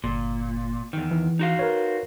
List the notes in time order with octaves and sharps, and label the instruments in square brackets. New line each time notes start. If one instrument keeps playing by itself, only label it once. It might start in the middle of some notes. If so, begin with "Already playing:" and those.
[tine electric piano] G1 [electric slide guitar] A#2
[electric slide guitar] E2 D#3
[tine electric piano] E3
[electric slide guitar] D#4 F#4 F5
[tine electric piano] A#4 B4 C#5